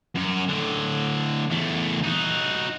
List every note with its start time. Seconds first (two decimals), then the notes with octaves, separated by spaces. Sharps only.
0.15 F#2 C#4
0.49 A2 D3
1.51 E2 A3
2.03 D#4 F#4